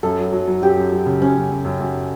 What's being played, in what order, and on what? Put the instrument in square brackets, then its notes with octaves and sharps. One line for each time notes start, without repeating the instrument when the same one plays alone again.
[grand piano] F#2 [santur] A4
[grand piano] F#3
F#3
F#3
[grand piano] F#2 [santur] G4
[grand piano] F#2
F#3
C#3
[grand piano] F#2 [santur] C#4
[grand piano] F#2
F#2
F#2
F#2